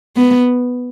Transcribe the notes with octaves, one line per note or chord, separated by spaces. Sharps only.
B3